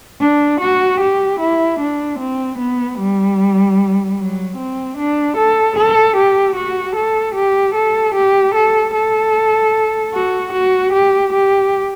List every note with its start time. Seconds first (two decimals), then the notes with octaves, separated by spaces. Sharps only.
0.20 D4
0.60 F#4
1.00 G4
1.40 E4
1.80 D4
2.19 C4
2.59 B3
2.99 G3
4.19 F#3
4.57 C4
4.98 D4
5.37 A4
5.76 A4
6.17 G4
6.56 F#4
6.96 A4
7.35 G4
7.75 A4
8.15 G4
8.55 A4
8.94 A4
10.14 F#4
10.53 F#4
10.93 G4
11.33 G4